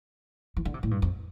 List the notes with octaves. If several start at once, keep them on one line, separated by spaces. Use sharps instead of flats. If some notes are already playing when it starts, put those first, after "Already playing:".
E3
D3
C3
A2
G2
F2